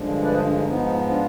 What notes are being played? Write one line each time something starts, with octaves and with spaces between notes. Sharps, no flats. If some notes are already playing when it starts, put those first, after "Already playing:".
Already playing: G2 D3 F3 G#3 D4
B4 D5
G#4 C5
D4
D#4
G#2 F3 B3 D#4
D4 F4